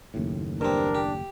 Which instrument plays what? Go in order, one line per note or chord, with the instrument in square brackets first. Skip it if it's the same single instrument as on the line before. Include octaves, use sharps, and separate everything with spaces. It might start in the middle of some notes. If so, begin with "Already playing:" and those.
[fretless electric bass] F#1 D#2 A2
[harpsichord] G2 C4 [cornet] D4 [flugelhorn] A#4
[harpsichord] G4